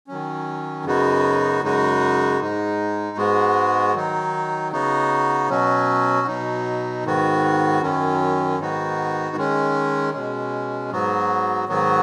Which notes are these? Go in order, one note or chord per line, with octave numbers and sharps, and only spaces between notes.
D#3 F#3 C#4
F#2 C#3 B3 D#4 F#4
F#2 C#3 G#3 D#4 F#4
G#2 G#3 D#4
G#2 G#3 B3 F#4
D#3 F#3 D#4
C#3 B3 D#4 F#4
B2 F#3 C#4 F#4
B2 F#3 D#4
G#2 D#3 B3 F#4
F#2 D#3 F#3 C#4
G#2 D#3 B3 D#4 F#4
D#3 G#3 C#4
B2 G#3 C#4
G#2 F#3 B3 F#4
G#2 D#3 F#3 B3 F#4